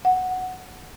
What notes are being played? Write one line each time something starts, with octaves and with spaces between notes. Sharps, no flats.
F#5